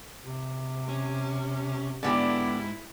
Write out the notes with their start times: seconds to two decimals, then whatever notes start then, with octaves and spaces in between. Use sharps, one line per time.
0.25 C3
0.89 C#4
2.03 G#2 D3 B3 E4 G4